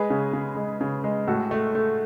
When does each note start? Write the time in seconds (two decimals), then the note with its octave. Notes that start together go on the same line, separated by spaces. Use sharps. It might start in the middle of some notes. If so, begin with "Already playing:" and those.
Already playing: G#3 G#4 B4
0.10 C#3
0.33 C#3
0.57 G#3
0.81 C#3
1.04 G#3
1.28 A2 F#4 A4
1.51 A3
1.75 A3